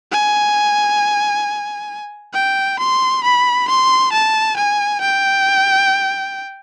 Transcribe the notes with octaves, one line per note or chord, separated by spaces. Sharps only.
G#5
G5
C6
B5
C6
A5
G#5
G5